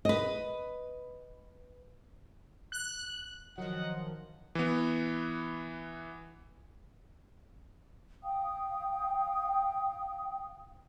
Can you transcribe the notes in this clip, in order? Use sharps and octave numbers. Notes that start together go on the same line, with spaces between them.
B4 D#5
F#6
D#3 F3 F#3 D#5 F#5
E3 B3
F5 G5 D#6